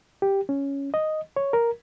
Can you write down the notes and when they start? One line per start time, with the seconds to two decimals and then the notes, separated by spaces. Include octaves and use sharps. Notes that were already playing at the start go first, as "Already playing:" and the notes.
0.22 G4
0.49 C#4
0.94 D#5
1.36 C#5
1.53 A#4